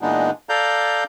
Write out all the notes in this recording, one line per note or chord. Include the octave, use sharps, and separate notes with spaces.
A#2 E3 G#3 B3 D4 D#4
A4 D5 F5 A#5 G6